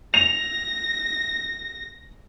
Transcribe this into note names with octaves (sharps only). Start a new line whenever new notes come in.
A#6 F7